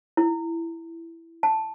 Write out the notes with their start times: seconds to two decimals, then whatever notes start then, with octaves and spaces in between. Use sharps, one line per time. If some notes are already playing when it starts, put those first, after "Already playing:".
0.17 E4
1.43 A5